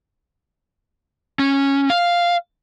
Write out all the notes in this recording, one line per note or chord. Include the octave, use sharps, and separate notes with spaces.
C#4
F5